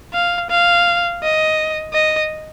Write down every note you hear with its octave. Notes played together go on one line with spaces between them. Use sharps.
F5
F5
D#5
D#5